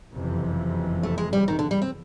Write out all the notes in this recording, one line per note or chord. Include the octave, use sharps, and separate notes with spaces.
F#1 F2 C3 E3
A3
G#3
G3
D#3
D3
G3
C4